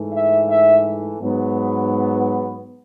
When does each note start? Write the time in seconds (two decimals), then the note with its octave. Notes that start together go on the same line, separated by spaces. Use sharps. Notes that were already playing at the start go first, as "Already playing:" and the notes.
Already playing: G#2 E3 A3
0.12 E5
0.49 E5
1.21 G#2 F#3 B3